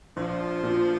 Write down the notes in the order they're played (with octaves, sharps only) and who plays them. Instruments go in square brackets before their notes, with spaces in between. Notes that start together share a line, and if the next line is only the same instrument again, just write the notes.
[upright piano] A#1 [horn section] F3
[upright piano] A#2